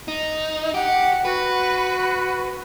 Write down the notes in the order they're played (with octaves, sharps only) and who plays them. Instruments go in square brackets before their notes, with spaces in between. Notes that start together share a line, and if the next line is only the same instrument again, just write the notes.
[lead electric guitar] D#4
[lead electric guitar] G4 [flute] F#5
[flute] F#4 [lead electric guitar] B4